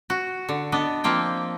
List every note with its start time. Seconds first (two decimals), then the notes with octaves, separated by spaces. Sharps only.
0.10 F#4
0.49 D3
0.72 B3 D4 D#5
1.04 F3 A#3 C4 G5